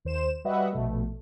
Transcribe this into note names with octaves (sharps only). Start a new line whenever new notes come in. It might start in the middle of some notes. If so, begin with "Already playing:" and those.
D#2 C5 E7
G3 F#4 B4 D#5 E5 F#5
A#1 B2 A3